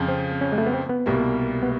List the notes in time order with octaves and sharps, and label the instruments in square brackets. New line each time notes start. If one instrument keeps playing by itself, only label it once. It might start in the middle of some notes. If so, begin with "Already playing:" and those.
Already playing: [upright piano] F2 C#3 F3
[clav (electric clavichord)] C4
C#4
G#3
A3
B3
C4
B3
[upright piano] C2 B2 G3 A#3
[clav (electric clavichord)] B3